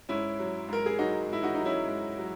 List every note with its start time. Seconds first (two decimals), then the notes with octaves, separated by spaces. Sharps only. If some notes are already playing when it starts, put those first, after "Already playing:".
0.09 G#2 C#4 E4
0.39 F#3
0.68 G#2 A#4
0.86 G#4
0.98 F#3 D#4 F#4
1.28 G#2 E4
1.43 D#4 F#4
1.55 F#3 D#4
1.65 C#4 E4
1.88 G#2
2.18 F#3